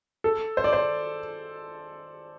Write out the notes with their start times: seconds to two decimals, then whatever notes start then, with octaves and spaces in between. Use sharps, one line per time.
0.24 A4
0.57 C5
0.64 D5
0.73 C5